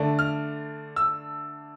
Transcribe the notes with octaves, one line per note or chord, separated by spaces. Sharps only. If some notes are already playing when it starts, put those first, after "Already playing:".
Already playing: D3 A3 D4
F6
E6